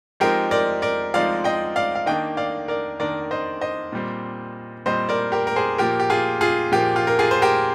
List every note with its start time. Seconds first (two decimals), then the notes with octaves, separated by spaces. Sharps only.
0.20 F3 G#3 C4 D#4 G4 A#4
0.51 A#4 D5
0.82 A#4 D5
1.14 F3 G#3 C4 D#4 D5 F5
1.44 D#5 G5
1.76 D5 F5
1.95 F5
2.06 D#3 A#3 D4 D#5 G5
2.37 D5 F5
2.68 A#4 D5
3.00 D#3 A#3 D4 A#4 D5
3.31 C5 D#5
3.61 C5 D#5
3.92 A#2 G3 C4
4.86 A#2 G3 C4 C5 D#5
5.09 A#4 D5
5.32 G4 A#4
5.47 A#4
5.56 G#4 C5
5.78 A#2 F3 A#3 G4 A#4
6.00 G4
6.10 F4 G#4
6.41 F4 G#4
6.71 A#2 F3 A#3 G4
6.96 F4
7.07 A#4
7.19 F4 G#4
7.31 C5
7.42 G4 A#4